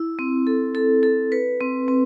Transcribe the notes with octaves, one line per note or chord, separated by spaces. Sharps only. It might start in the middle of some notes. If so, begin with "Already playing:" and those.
Already playing: E4
C4
A4
A4
A4
B4
C4
C4